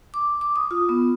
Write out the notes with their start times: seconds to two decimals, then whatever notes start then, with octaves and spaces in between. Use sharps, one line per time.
0.14 D6
0.41 D6
0.56 D#6
0.71 F4
0.89 B3